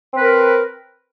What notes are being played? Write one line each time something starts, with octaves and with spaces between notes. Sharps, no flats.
C4 A#4 B4